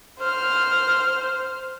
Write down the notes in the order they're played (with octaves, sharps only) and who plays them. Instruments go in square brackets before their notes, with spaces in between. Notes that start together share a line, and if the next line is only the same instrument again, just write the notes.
[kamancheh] C5 F6